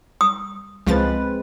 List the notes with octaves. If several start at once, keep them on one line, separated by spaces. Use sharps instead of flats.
D#6
C#2 F3 G#3 C4 B4 A6